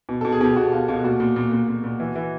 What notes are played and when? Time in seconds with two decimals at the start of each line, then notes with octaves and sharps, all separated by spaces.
0.09 B2
0.21 B2 A4
0.32 G#4
0.41 B2 G4
0.56 B2 F#4
0.72 B2 F4
0.88 B2 F4
1.04 A#2 F#4
1.20 A#2
1.36 A#2
1.52 A#2
1.68 A#2
1.84 A#2
2.00 E3
2.16 E3